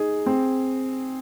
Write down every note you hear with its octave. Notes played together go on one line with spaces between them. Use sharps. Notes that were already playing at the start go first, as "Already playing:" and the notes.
Already playing: D#4 G#4
C4